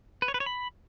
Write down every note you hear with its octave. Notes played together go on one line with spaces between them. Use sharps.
B4
C#5
B4
C#5
B5